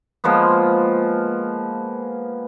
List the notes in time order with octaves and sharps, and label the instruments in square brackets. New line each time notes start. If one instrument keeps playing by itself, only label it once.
[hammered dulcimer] F3 G#3 A#3 B3